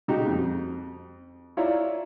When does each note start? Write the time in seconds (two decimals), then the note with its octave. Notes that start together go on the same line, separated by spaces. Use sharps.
0.08 C#3 D#4 F#4 G4
0.27 F2
1.57 E4 F4 C#5 D5 E5 A#5